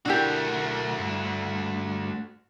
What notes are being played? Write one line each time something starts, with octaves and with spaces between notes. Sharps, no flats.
B1 A3 D4 E4 F#4 G4 A#4
G2